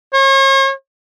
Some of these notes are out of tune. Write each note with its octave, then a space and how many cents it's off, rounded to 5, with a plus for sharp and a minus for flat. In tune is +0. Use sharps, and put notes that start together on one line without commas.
C#5 -40